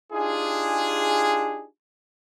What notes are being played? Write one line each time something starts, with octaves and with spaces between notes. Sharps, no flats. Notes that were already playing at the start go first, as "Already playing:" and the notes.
D4 D#4 F4 G4 G#4